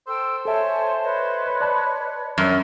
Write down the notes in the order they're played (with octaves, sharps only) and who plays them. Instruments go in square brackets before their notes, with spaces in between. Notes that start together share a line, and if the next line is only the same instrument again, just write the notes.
[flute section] A4 G5 E6 [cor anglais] C5
[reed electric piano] A4 E5 [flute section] C#5 G#5 A5
[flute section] B4 C#5 D#5
[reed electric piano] D5 A5 B5
[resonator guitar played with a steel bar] F#2